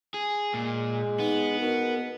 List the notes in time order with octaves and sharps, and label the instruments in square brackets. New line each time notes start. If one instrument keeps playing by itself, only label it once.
[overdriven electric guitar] G#4
[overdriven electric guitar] A#2 [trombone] G#3
[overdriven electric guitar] B3 [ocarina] D#4
[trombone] B2 [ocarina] A#4